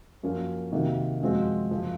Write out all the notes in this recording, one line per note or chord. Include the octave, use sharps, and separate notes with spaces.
F#2 F3 A#3 C#4 F#4
C3 D#3 A#3 D#4 F#4
F#2 F3 G#3 C4 F#4
F#2 C#3 F3